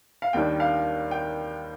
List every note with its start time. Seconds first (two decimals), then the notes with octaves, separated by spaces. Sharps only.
0.22 F5
0.33 D#2 D#3 G3 A#3 D4 G5
0.60 F5
1.11 G5